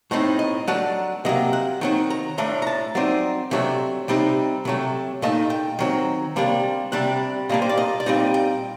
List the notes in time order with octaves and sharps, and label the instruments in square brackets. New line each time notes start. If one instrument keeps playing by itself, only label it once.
[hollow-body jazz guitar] A2 A3 C4 D#4 D#5
D#5
F#3 A3 D4 F#5
C3 F#3 A#3 D#5
F#5
D#3 F#3 C4 D#4 G5
A#5
A2 A3 D4 A#5
A#5
A5
F#3 C4 D#4 D5
C3 F#3 A3 D4 D#4
C3 G3 C4 D#4
C3 F#3 A3
A#2 A3 D#4 D#5
G5
D#3 F#3 C4
C3 G3 A#3 D4
C3 G3 D4 F#5
A#2 G3 A#3 D4 D#5
C5
D5
D#5
D5
A#2 G3 C4 D#4 D#5
G5